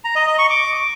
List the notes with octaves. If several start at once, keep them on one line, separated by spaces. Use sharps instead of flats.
A#5
D#5
D#5
C#6
D6